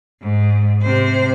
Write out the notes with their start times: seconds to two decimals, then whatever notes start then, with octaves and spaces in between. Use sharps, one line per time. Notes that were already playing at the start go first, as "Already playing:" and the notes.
0.22 G#2
0.82 C3 C5